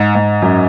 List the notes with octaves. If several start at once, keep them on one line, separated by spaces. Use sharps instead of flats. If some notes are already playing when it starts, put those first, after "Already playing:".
Already playing: G#2
G#2
F#2